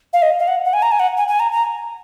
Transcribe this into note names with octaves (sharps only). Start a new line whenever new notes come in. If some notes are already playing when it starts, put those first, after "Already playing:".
F5
D#5
F5
F#5
F#5
G#5
A#5
G#5
F#5
G#5
G#5
A#5
A#5